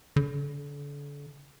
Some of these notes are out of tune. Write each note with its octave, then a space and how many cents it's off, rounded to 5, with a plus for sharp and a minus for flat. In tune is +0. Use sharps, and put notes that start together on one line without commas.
D3 -35